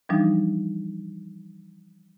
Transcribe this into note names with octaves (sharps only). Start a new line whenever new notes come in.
E3 F3 G3 D4 D#4